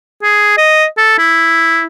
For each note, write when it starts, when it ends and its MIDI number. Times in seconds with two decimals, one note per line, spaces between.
0.23 0.53 68
0.58 0.85 75
0.98 1.17 69
1.18 1.85 64